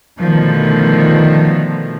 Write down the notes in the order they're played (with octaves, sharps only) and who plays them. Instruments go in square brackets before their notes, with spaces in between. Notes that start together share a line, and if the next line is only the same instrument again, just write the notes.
[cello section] B2 D3 D#3 F3 A3